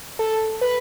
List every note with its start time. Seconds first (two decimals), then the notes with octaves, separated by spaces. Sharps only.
0.19 A4
0.61 B4